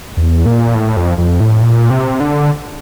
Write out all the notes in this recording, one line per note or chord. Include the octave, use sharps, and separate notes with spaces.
E2
A#2
A2
F2
F2
A2
A#2
C3
D3